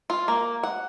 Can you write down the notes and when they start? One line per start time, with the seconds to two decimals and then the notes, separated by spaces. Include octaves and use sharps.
0.10 F4
0.28 A#3
0.63 F#5